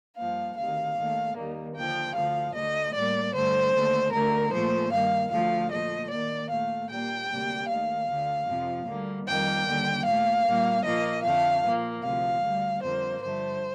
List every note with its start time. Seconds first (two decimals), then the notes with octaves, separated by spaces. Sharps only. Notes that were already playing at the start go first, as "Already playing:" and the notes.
0.16 G2 F3 A#3 F5
0.56 D2 C3 D#3 F5
0.96 D#2 D#3 A3
1.35 D#2 D#3 G3 A#3
1.75 D#2 D3 F3 G5
2.15 D2 D3 F3 F5
2.54 D2 D3 A3 D#5
2.94 A2 G3 A#3 D5
3.33 G2 D3 A3 C5
3.73 D#2 D3 A3
4.12 D2 D3 A3 A#4
4.52 A#2 F3 A3 C5
4.91 G2 D#3 A#3 F5
5.31 D2 D3 F3 A3 F5
5.70 A#2 F3 A3 D#5
6.10 D#2 D#3 A#3 D5
6.50 A#2 A3 F5
6.89 A#2 G3 A#3 G5
7.29 D2 C3 G3 A#3
7.68 D#2 D#3 A3 F5
8.08 D2 D3 A3
8.47 F2 C3 F3
8.87 D2 D3 G3 A#3
9.26 F2 D#3 G3 A#3 G5
9.66 D#2 D3 G3
10.05 A#2 A3 F5
10.45 A#2 G3 A#3
10.84 A#2 F3 A#3 D#5
11.23 F2 D3 A3 F5
11.64 A#2 F3 A#3
12.03 D2 C3 F3 F5
12.42 D2 D3 G3
12.82 F2 D3 G3 A#3 C5
13.22 G2 D3 F3 A3 C5